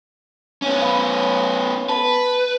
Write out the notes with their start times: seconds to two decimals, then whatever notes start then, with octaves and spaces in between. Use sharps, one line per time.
0.62 B3 C#4
0.82 F5 B5
1.89 B4 A5